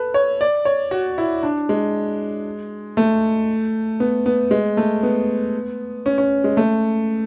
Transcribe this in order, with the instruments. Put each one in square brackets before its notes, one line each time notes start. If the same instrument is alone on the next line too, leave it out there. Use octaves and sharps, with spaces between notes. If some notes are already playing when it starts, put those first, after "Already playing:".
Already playing: [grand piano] A4 B4
C#5
D5
C#5
F#4
E4
D4
G#3
A3
B3
B3
G#3
A3
B3
C#4
C#4
G#3
A3